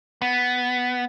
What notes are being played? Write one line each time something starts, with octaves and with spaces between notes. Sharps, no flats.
B3